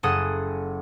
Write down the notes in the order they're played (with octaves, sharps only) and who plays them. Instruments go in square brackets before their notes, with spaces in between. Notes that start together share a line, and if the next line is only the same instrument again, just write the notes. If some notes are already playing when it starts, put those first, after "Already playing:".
[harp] F#1 G#4 A4 F#5 D#6